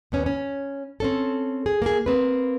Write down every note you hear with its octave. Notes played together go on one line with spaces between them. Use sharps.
D#2 B3 C#4
C#4
C4 C#4 A4
G#4
A#3 G#4
A#3 C4 B4